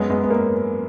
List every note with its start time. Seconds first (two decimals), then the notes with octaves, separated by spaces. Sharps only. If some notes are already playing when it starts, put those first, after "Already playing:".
Already playing: F#2 G#3 B3
0.10 G#3 B3
0.23 B3
0.30 A#3